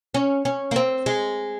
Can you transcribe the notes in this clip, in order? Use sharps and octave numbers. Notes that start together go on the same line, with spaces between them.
C#4
C#4
A#3
C4
G#3